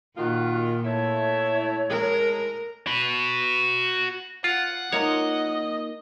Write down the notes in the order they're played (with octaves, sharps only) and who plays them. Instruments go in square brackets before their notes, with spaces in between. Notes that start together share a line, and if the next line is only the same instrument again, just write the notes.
[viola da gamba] A#2 [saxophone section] D#3 F4 [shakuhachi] F#4
[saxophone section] A3 E4 [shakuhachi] C#5
[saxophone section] A2 G#3 [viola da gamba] A#4
[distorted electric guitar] F#4 B5
[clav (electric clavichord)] F4 [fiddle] F#5
[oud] A#3 D#4 F4 [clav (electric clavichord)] C#5 [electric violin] D#5